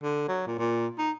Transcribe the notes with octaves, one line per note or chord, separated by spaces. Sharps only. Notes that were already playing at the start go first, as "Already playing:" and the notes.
D3
F#3
A#2
A#2
D#4